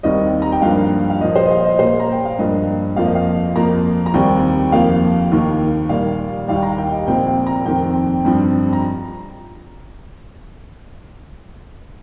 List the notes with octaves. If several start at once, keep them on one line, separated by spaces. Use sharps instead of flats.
D#2 D#3 G3 C4 D#5
A#5
G5
G2 F3 A#3 F5
F5
A#2 F3 A#3 D#5
C5
D#5
F5
D#5
A#2 A#3 C5
A#5
G5
F5
G2 F3 A#3 D#5
F2 F3 A#3 F5
D#5
F5
F2 F3 A#3 A#5
A#5
D#2 D#3 G3 C4 G5
F2 F3 A#3 F5
D#2 D#3 A#3
A#2 G3 A#3 F5
D#2 D#3 G3 F5
G5
A#5
G5
D#5
A#2 F3 C4 G5
G5
A#5
F2 D#3 C4 G5
G2 F3 C4
A#5